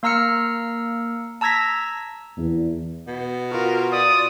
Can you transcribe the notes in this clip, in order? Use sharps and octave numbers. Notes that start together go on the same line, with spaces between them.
A#3 F5 A#5 E6 F6 C#7
A5 A#5 E6 G#6 A#6 B6
E2
B2
F4 F#4 A#4
D5 D#6